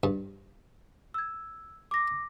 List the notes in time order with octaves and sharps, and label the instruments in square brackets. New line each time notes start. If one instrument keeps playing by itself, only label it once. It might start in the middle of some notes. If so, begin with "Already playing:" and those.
[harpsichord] G2
[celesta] E6 G#6
D6 A#6